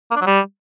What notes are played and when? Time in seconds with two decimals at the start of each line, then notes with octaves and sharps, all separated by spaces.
0.11 A#3
0.16 D4
0.21 F#3
0.27 G3